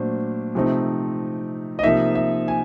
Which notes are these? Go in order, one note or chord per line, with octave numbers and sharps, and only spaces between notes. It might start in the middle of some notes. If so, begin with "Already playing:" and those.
Already playing: A#2 F#3 A3 D4 C5
C3 F3 A3 C4 D#4
D#5
C3 F3 A#3 D#4 E5
E5
G#5